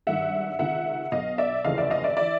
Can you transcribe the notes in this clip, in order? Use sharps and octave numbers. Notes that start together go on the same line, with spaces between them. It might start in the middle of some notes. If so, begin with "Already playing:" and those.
G#1 G2 D#3 E5 F#5
C#2 C3 D#3 E5 F#5
B1 B2 D#5 F5
D5 E5
F1 D#2 C#3 E3 D#5 F5
D5 E5
D#5 F5
D5 E5
E3 D5 E5